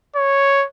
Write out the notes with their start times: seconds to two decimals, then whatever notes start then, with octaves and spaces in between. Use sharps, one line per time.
0.15 C#5